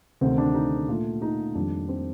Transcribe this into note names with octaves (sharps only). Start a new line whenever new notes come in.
D2 C3 D#3 C4
D4
D#4
A#2 A3 F4
D#4
F2 D#3 G3 A#3 D4
C4